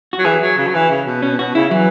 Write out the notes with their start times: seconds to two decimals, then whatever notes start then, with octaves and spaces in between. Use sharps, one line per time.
0.13 F#4
0.19 F#3
0.25 E3 G#4
0.41 F#3
0.58 C#3
0.67 F#3
0.74 E3
0.90 C#3
1.06 B2
1.22 B2 C#4
1.38 B2 F#4
1.55 C#3 E4
1.71 E3 F#3